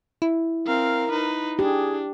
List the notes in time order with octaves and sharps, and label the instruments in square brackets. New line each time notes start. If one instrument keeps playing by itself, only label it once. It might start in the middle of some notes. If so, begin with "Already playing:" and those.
[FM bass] E4
[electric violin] C4 F5 [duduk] A#4
[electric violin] D#4 B4
[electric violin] D4 [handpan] G4 [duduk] G#4